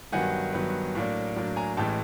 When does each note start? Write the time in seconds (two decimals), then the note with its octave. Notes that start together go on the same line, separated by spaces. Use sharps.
0.12 G2 D#3 F#3 B3 F#5 G#5
0.53 G2 D#3 F#3 B3
0.95 A2 F#3 A#3 D4
1.36 A2 F#3 A#3 D4
1.56 G#5 A#5
1.77 A1 A2 E3 G#3 G5 A5